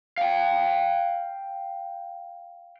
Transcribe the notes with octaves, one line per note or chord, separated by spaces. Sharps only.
F5 G5